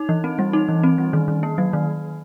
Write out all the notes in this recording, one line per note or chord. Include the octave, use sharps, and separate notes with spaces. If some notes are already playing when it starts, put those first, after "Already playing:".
Already playing: D#4
E3
C4
G3
D#4
E3
C4
G3
D#3
D#3
A#3
F#3
D#3